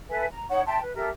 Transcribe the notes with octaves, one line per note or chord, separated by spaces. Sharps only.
A4 B4 E5 G#5
A#5
D#4 C#5 F#5 C#6
E5 G5 A5 C6
B4
G4 A4 A#4 E5